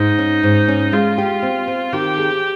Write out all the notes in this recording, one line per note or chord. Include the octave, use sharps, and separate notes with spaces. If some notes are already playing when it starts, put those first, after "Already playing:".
Already playing: G#2 D#4
C#4
G#2
C#4
G#3 F4
G4
C4
C4
D#3 G4
G#4